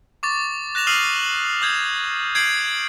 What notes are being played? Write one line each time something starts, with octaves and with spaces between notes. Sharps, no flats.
C#6 D6 A6
F#6 A#6 E7 F7
D#6 F6 C7 D#7 F7 F#7
D#6 G6 G#6
G6 G#6 C7 D7 F#7